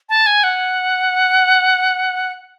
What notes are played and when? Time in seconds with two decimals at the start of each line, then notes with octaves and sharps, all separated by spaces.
0.09 A5
0.27 G#5
0.44 F#5